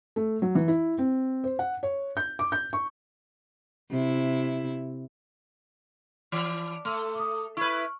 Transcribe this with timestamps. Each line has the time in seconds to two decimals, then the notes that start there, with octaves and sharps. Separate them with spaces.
0.16 A3
0.42 F#3
0.55 E3
0.68 E4
0.98 C4
1.44 C5
1.59 F#5
1.83 C#5
2.17 G6
2.39 D6
2.52 G6
2.73 C#6
3.91 C3 E4
6.32 E3 D5 D6
6.85 A3 C6 E6
7.15 D6 D#6
7.57 E4 B4 C#6 F6